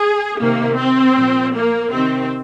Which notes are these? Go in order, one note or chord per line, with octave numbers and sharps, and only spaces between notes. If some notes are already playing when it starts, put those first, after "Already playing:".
Already playing: G#4
C3 D#3 A#3
C4
A#2 F3
A#3
C3 D#3 C4